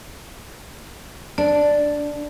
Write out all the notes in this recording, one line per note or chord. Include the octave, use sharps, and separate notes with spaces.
D4 D5